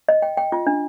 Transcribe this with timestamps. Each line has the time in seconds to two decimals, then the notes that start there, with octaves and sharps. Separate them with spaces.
0.09 D#5
0.22 G5
0.37 G5
0.52 F4
0.67 D4